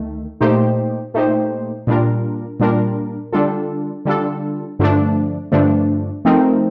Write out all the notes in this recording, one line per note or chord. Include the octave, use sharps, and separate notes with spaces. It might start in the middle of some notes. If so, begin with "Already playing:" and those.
Already playing: D2 D#3 A3
A#2 A3 D#4 G4 C5
A#2 A3 D#4 G4 C5
A#2 G3 D4 F4 A#4
A#2 G3 D4 F4 A#4
D3 G3 D4 F4 A4
D3 G3 D4 F4 A4
G2 D3 F3 A3 D4
G2 D3 F3 A3 D4
F3 A3 C4 D#4 A#4